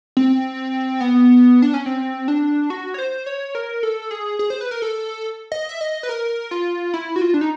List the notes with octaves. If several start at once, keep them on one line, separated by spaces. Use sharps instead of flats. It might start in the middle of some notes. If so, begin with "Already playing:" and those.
C4
B3
D4
C#4
C4
D4
F#4
C#5
C5
C#5
A#4
A4
G#4
G#4
C5
B4
A#4
A4
D#5
E5
D#5
B4
A#4
F4
E4
F#4
F4
D4
D#4